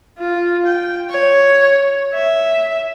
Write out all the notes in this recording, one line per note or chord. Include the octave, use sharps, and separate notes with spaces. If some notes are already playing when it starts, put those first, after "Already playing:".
F4
G5
C#5
E5